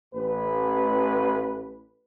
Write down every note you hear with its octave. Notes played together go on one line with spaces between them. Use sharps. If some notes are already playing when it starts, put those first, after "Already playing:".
A1 B4